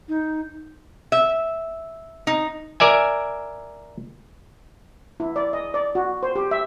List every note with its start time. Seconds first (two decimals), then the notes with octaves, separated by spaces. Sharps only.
0.09 D#4
1.12 E5
2.27 D#4
2.80 A#4 D5 E5 G#5
5.20 E4
5.36 D5
5.53 D#5
5.74 D5
5.95 F#4
6.23 C5
6.36 G4
6.51 E5